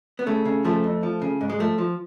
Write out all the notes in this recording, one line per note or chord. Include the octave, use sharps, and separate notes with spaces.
B3
C#3 A3
C#3
F3 A3
F2
F3
C#3
G#2
G#3
F3 A3
F3